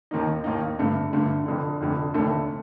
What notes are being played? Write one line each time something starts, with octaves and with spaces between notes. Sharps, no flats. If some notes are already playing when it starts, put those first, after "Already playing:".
D#2 D#3 A#3 D#4
D#2 D#3 A#3 D#4
G2 D3 A3
G2 D3 A3
F1 F2 D3
F1 F2 D3
F1 D#2 D3 A3